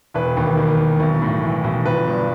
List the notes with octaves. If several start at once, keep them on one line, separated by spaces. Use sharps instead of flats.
E1 B4
D#2
D#3
E1
B1
A2
E3
B1
G1 B4
G2